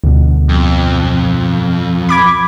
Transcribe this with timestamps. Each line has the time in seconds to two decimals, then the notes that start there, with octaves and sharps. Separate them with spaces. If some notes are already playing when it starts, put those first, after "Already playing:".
0.04 D2 G2 B2
0.49 F2
2.09 B5 D6 G#6